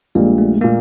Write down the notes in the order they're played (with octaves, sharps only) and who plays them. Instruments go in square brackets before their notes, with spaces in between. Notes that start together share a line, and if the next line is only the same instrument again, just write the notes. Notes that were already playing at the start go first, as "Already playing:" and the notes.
[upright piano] A#1 A#2 G3 [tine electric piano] G#3
[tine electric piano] A3
[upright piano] A#2 [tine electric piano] A#3